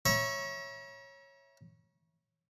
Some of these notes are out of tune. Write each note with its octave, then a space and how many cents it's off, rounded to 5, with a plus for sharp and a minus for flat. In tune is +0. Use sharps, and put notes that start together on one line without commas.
C#5 -10 E5 +0 A#5 +45